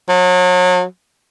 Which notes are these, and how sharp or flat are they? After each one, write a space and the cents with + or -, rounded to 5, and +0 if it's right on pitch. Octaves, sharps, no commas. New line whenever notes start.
F#3 -35